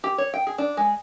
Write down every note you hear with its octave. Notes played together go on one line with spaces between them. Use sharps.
G4
C#5
G5
G#4
D4
G#3